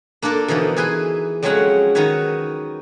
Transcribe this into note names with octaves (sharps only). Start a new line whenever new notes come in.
A#3 D4 F4 A4 A#4
B2 D3 E3 F3 D#4
E3 E4 G#4 B4 G#5 C6
F2 C#3 F#3 G#3 C#5 F#5
D#3 D#4 F#4 B4 C#5